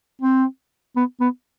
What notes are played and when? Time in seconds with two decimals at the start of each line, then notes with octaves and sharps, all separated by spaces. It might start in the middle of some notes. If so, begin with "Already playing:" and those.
0.21 C4
0.96 B3
1.20 B3